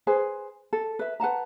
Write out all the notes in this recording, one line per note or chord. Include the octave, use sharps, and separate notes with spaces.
G#4 B4 C5 G#5
A4
B4 E5
B4 F#5 A5 A#5